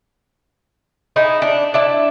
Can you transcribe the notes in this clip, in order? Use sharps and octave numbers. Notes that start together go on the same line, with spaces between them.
D#4 E4 G#4
D4
D4 E4 A5